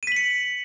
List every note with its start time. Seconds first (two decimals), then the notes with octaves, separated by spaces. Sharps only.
0.03 D#7
0.07 B6
0.12 F#7
0.16 C#7